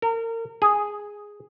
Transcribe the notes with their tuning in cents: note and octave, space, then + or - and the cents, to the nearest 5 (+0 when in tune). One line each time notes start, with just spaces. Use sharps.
A#4 -35
G#4 -5